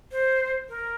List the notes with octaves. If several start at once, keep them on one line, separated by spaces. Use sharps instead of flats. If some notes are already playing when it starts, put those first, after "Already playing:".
C5
A#4